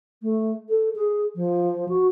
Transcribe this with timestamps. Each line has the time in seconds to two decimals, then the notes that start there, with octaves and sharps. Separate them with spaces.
0.22 A3
0.69 A4
0.95 G#4
1.35 F3
1.89 F#4